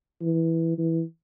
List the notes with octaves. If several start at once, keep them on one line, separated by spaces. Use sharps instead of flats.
E3
E3